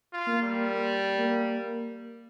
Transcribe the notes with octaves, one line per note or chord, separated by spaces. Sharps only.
F4
A#3
G3
A#3